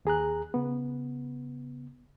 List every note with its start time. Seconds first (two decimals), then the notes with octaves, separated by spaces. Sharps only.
0.05 D#2 G#4 A#5 F#6
0.54 C#3 B3